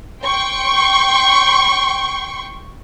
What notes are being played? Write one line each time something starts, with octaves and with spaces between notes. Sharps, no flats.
G5 C6 C#6